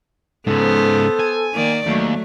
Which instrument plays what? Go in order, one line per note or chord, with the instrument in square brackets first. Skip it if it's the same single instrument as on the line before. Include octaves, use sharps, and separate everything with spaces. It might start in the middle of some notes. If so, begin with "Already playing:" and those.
[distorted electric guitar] G#2 C#3 [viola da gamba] B3 C5 [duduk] A4
[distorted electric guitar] G#5
[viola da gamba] D#3 A#3 D5
[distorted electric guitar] D#2 [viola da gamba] F#3 A3